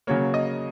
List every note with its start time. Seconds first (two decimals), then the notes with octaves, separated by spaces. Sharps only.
0.07 C#3 F#3 A#3 C#5
0.34 D#5